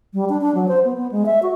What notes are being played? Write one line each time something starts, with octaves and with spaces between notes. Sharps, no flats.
G3
D4
D4
F#3
C5
B3
B3
G#3
E5
F#4